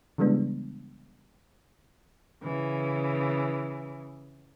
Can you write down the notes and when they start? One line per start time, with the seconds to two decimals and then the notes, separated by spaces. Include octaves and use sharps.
0.18 C#3 E3 G3 G#3 B3 D4
2.43 C#3 E3